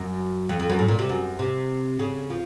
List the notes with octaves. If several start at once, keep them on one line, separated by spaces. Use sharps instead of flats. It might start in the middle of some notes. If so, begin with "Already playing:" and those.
Already playing: F#2
F2
F2
F#2
A2
A#2
C3
F#2
C3
C#3
F3